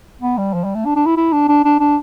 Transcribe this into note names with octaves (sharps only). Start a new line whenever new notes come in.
B3
G3
F3
G3
A3
D4
D4
E4
E4
D4
D4
D4
D4